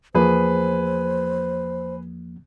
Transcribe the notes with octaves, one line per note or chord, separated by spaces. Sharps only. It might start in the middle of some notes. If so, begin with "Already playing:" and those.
E2 F3 A#3 G#4 B4 C5